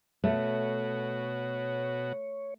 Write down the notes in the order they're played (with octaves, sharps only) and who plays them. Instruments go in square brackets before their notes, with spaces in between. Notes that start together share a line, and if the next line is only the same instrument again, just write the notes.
[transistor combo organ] B2 F#4 [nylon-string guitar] A3 [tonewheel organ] C#5